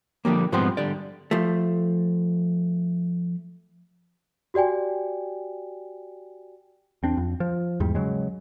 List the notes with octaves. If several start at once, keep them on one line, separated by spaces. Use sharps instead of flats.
D3 F3 G3 A#3
G#2 F3 G3 B3 C4 C6
D3 G3 D5
F3 A3
F#4 G4 D5 G5 G#5
E2 C4 D4
F2
F3
E2 G#2 G3
C#3 F#3 G#3